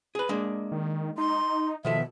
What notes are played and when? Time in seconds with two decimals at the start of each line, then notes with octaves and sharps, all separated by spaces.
0.15 G#4 B4
0.29 G#3 A#3 D4
0.72 D#3
1.18 D#4 C6
1.85 B2 D#3 F3 A4 E5